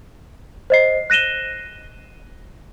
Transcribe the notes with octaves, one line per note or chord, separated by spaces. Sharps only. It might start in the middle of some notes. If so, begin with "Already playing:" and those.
C5 D#5 C7
F#6 A#6 D#7 E7 G7